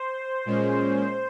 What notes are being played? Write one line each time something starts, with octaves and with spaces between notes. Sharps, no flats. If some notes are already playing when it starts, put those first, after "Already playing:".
Already playing: C5
A#2 G#3 C#4